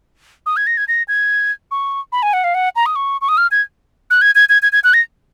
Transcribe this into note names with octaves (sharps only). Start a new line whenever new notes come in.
D#6
G#6
A#6
G#6
A#6
G#6
C#6
B5
G#5
F#5
F5
F#5
A#5
D#6
C#6
C#6
D#6
F6
G#6
F#6
G#6
G#6
G#6
G#6
G#6
F#6
A#6